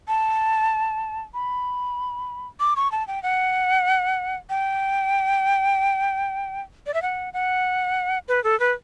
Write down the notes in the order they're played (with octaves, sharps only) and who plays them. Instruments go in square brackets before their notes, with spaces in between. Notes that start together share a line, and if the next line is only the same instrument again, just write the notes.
[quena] A5
B5
D6
C#6
A5
G5
F#5
G5
D5
E5
F#5
F#5
B4
A4
B4